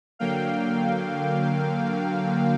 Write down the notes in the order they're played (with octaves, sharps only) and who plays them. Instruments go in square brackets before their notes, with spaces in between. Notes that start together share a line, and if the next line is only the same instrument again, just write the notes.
[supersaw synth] D3 F#3 A#3 F5 G5